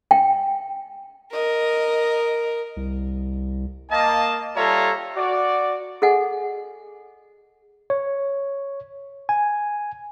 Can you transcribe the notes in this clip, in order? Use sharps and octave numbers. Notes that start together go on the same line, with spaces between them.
G5
A#4 D#5
C2
A#3 D#5 A5
G3 F4 A4 C#5 E5 A#5
F#4 D5
G#4 A4 D#5 F#5 G#5
C#5
G#5